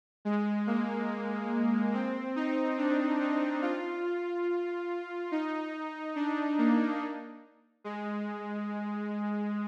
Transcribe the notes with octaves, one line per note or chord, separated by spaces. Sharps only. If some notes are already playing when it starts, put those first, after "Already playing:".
G#3
A#3
C4
D#4
D4
D#4
F4
D#4
D4
A#3
G#3